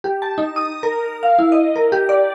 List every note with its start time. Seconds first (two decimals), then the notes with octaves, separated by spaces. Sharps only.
0.04 G4
0.22 A5
0.38 D#4
0.56 D#6
0.83 A#4
1.23 F5
1.39 E4
1.52 D#5
1.76 A#4
1.92 G4
2.09 D5